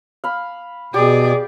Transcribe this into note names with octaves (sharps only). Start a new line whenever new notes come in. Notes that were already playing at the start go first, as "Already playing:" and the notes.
F5 B5
B2 G4 G#4 D5